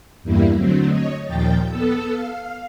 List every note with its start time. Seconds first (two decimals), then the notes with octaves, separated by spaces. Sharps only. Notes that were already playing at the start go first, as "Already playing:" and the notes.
0.23 E2 G2 G3 A#3 E4
0.55 D3 F#3 A3 C4
0.87 C#5 D#5
1.24 D#2 A#2 F3 G5 G6 A6
1.68 B3 A4 E6
2.11 F5